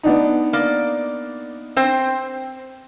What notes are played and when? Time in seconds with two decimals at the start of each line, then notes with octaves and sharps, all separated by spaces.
0.03 B3 D4 D#4
0.53 A#3 D5
1.77 C4 C5